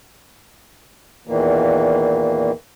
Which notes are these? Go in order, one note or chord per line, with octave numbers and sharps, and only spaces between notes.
E2 A#2 D#3 E3 A#3